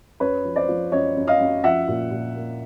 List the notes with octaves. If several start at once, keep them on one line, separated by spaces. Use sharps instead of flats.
F#2 B4 C#5
F3
C5 D5
F3
F#2 C#5 D#5
F#2
D#5 F5
F#2
F3 E5 F#5
A#2
A#2
A#3